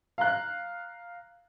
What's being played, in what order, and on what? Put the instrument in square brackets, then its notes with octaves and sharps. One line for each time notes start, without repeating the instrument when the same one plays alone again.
[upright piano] F5 A#5 F#6